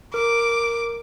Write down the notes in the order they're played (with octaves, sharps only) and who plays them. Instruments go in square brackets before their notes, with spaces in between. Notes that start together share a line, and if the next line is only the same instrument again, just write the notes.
[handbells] A#4 [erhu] D6